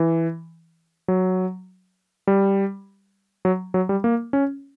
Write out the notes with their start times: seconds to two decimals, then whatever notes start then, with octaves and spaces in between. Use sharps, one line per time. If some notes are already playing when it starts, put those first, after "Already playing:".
Already playing: E3
1.08 F#3
2.27 G3
3.45 F#3
3.74 F#3
3.89 G3
4.04 A#3
4.33 C#4